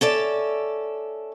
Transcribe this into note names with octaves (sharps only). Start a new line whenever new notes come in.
C#4 A4 D5 E5